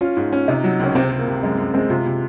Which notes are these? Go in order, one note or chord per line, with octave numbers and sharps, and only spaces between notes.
C#4 F4
G#2
C#4
C3 D#4
F#3
C#2 C#4
C3 C4
C3
A#3
C3
F#2 G#3
F#2
G#3 C4
C3 F4
C3